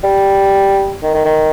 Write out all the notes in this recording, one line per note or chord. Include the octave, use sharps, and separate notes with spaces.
G3
D#3
D#3
D#3